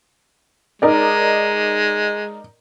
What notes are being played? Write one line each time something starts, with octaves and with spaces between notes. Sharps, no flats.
G#3 D#4 A#4 D5